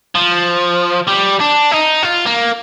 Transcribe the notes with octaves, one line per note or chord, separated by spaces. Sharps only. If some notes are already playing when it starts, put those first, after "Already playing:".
F3
G3
D4
D#4
F4
A#3